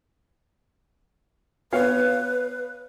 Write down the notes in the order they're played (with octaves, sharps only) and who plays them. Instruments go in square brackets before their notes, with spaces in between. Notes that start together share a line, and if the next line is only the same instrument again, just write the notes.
[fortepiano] B3 C#5 F5 [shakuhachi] B4